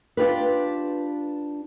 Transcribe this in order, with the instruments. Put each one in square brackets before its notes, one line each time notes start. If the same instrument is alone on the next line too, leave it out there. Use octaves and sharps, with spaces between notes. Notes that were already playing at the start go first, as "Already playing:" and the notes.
[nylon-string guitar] D4 F4 G4 B4